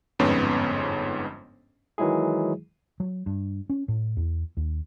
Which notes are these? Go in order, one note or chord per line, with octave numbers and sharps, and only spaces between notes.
G1 F2 G#2 B3 C#4 C#5
D#3 E3 F#3 G#3 E4 G#4
F#3
G2
C#4
A2
E2
D#2